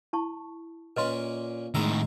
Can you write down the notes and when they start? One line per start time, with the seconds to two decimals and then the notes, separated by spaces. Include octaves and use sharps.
0.13 E4 A5 C#6
0.97 A#2 C#4 B4 D#5 C6
1.75 A2 D#3 G#3 A#5 E6